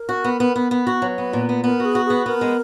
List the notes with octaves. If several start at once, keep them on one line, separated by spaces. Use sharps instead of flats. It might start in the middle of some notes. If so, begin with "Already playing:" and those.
Already playing: A#4
F#4
B3
B3
B3
B3
F#4
F#3 B4
B3
A#2
B3
B3 A#4
F#4
G#4
F#4
B3 G#4
B3 A#4
G#3